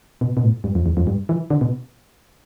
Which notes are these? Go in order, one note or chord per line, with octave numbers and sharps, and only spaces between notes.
B2
B2
A2
G2
F2
E2
F2
G2
E3
D3
B2